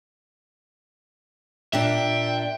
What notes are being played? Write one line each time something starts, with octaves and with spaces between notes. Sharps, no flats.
A#2 D4 E5 G5